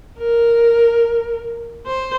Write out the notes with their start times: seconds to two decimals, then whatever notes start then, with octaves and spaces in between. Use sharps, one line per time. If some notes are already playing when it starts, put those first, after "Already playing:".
0.19 A#4
1.86 C5